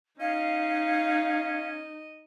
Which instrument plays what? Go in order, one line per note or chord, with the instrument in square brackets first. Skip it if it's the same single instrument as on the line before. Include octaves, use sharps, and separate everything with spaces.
[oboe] C#4 [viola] D#4 [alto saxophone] D#5 [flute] F5